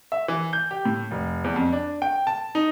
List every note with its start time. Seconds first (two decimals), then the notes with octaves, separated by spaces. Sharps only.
0.12 E5
0.28 E3
0.53 G6
0.71 G4
0.85 A2
1.11 F1
1.44 E2
1.56 F2
1.73 D4
2.02 G5
2.27 A5
2.55 D#4